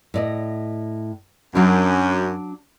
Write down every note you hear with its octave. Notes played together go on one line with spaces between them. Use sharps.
A2 D5 D#5
F#2 F#3 D4